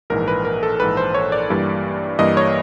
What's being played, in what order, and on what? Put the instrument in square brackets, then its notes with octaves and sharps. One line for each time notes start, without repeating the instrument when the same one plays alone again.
[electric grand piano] A#1 G#2 E3 A#4
B4
A#4
A4
A#1 G#2 E3 B4
C5
C#5
D5
G2 E3 G3 A#3
G2 E3 G3 A#3 D#5
C#5